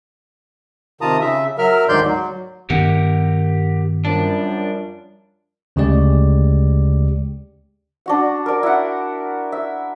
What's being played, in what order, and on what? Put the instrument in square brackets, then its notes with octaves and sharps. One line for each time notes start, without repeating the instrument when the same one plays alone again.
[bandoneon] C3 D#3 F4 A5 A#5 D#6
C#3 E5
F#3 A#4 E5 F6
D2 G#2 D#3 D5 C6 G6
F#3
[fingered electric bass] G2 D#3 B3 [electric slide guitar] G4 A#4 F#5
[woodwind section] F#2 F3 G3 [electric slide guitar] D4
[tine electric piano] D2 C#3 G#3 G4 D5
[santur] D4 F#4 F#5
A#4 D5
E4 F#5
E5